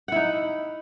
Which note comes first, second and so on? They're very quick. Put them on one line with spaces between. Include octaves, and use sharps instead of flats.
F#5 E4 D#4